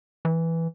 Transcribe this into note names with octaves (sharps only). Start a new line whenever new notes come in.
E3